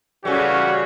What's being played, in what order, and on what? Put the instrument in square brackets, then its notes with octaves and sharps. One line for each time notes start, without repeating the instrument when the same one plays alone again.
[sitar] C#3 G3 [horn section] E3 A4 C#5 [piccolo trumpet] F#4